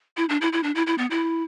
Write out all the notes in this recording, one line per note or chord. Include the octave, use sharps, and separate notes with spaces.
E4
D4
E4
E4
D4
E4
E4
B3
E4